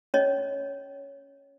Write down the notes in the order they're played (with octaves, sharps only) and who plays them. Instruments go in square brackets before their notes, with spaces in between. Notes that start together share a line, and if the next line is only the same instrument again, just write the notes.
[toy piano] C#4 C#5 D#5